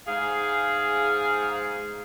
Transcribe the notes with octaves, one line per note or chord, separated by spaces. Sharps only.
G#2 G#4 F5